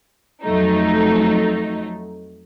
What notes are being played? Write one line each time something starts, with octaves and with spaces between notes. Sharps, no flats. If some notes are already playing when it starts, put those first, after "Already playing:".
F2 F#3 A3 D#4